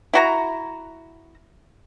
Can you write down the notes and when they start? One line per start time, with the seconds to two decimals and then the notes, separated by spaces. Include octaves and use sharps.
0.14 E4 F#4 A#5